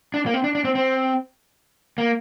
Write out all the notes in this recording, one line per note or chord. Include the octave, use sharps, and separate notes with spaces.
D4
A#3
C4
D4
D4
C4
C4
A#3